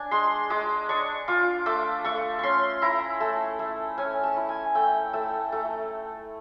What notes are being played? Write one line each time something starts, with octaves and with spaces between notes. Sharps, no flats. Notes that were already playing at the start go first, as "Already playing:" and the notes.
Already playing: D4 G#5
G#3 C6
G#3 D6
D4 C#6
F4 D6
A3 D6
A3 C#6
C#4 C6 C#6
E4 A#5
A3 A5
A3
C#4 G#5
A5
E4
G#5
A3 G5
A3 A5
A3 A#5